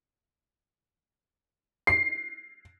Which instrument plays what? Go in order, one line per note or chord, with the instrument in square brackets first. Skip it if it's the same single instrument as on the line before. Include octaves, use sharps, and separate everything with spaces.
[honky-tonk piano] C7